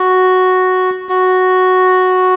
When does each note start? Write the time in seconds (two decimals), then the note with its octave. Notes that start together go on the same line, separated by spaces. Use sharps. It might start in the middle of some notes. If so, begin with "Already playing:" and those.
Already playing: F#4
1.09 F#4